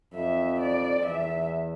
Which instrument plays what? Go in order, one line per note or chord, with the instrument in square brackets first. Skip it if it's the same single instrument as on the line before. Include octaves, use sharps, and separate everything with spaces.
[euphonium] F2 [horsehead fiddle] E5
[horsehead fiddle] D5
[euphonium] E2 [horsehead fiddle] E5